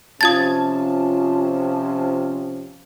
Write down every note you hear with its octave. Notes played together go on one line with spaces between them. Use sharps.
C3 F3 C#4 F4 A5 D#6 G#6 A6